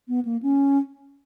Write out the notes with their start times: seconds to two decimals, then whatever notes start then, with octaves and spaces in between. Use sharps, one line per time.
0.08 B3
0.25 A#3
0.43 C#4